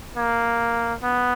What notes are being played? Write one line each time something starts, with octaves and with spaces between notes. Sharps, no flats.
A#3
B3